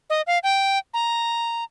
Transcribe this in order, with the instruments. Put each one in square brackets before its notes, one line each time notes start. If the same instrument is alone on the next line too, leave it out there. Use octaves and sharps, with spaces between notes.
[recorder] D#5
F5
G5
A#5